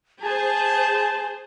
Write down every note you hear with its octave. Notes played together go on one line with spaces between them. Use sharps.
G#4 C5 G#5 A5